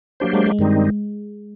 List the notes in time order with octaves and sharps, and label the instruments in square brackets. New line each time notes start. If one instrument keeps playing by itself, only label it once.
[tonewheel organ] F#3 A#3 D4 G4 C5
[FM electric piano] G#3
G#3
[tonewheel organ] G2 D#3 G3 C4 D#4